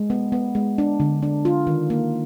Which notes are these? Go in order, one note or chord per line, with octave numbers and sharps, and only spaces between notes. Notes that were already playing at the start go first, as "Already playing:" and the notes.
Already playing: G#3
B3
B3
G#3
D4
D3
D4
F4
D#3
A#3